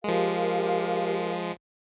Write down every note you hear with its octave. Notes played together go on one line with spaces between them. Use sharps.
F3 G#3 G4 A#4 F5